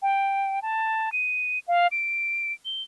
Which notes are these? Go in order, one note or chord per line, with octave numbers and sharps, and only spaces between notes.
G5
A5
D#7
F5
D7
G7